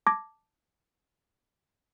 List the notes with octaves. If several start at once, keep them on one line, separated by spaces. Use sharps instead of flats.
A5 D6 G#6 A#6